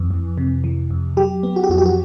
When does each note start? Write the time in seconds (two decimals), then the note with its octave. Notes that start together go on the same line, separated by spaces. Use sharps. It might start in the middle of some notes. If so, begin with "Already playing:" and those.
Already playing: F2 E3
0.11 F2
0.38 C3
0.64 E3
0.90 F2
1.17 F#3 G4
1.43 B3
1.56 F#4
1.64 G4
1.69 F2 F#4
1.78 G4
1.86 F#4